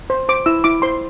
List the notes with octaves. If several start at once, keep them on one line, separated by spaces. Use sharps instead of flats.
C5
C5 D6
E4 E6
E4 D6
C5 C6